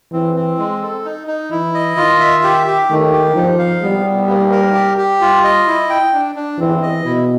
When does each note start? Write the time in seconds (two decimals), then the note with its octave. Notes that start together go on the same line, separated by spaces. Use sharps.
0.12 E3 C4
0.36 C4
0.58 G#3
0.82 A4
1.05 D#4
1.27 D#4
1.51 E3 E4
1.74 D#5
1.97 D#3 F4
2.20 E5
2.44 G4
2.67 G4
2.89 D#3 A3
3.12 G4
3.35 F3 D#4
3.59 F5
3.82 G3 B3
4.05 B3
4.28 A#3
4.52 A#4
4.74 G4
4.98 G4
5.21 G3 F4
5.44 D#5
5.67 E4
5.90 G5
6.13 D4
6.36 D4
6.59 E3 C4
6.82 D#5
7.05 B2 E4